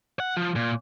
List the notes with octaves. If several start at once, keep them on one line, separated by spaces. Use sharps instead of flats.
F#5
F3
A#2